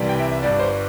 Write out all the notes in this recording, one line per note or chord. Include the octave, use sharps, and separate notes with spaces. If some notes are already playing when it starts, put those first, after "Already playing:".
Already playing: C2 C3 E3 G3
G5
E5
E5
G1 G2 G3 D5
C5